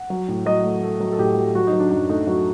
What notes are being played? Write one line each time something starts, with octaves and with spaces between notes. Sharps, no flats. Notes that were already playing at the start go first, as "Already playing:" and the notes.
Already playing: F#5
F#3
A2
F#3 D#5
A3
A3
F#3
A4
A2 G4
F#3
F#3 F#4
D#4
F#3
D4
F#2 D#4
A3 D#4
F#3 F#4